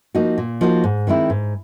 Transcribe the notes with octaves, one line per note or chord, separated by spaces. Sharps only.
F3 A#3 D#4 F#4
A#2
F3 A#3 D#4 F#4
G#2
D#3 G#3 C4 E4
G#2